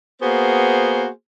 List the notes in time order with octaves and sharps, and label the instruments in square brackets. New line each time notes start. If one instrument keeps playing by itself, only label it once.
[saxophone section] A#3 B3 F#4 G#4 C5